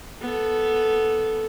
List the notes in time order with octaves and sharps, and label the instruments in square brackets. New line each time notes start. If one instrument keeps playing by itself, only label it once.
[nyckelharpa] B3 A4